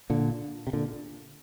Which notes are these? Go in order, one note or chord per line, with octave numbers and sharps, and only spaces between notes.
A#2 D3
C3
A#2 D3